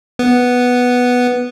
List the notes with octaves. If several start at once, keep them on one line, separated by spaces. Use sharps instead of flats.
B3